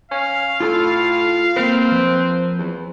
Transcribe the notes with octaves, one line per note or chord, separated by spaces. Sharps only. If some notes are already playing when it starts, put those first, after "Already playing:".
C#4 F5
A2 F4 A4
A#3 C4 A#4 B4
F3 A#4 B4
E2